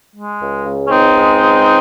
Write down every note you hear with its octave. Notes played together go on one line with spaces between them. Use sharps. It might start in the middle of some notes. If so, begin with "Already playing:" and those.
G#3
C#2
C#3
C#4
C#2 C4 D#4
G#3
C#2